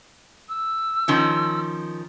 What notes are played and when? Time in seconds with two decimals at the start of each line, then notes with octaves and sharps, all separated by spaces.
0.49 E6
1.08 D#3 F3 C#4